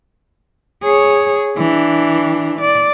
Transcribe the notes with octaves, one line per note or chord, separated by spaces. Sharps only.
G#4 C#5
E3 D4
D5